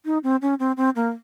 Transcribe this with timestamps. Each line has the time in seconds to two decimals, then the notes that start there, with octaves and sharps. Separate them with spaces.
0.05 D#4
0.24 C4
0.42 C#4
0.59 C4
0.77 C4
0.96 A#3